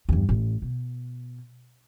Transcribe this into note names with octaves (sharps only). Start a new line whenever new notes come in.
E2 G2
A1
B2